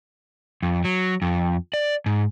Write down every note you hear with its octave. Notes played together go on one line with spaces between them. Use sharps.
F2
F#3
F2
D5
G#2